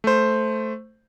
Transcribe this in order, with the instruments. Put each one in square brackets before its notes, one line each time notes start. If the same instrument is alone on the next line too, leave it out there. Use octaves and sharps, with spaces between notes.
[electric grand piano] A3 C5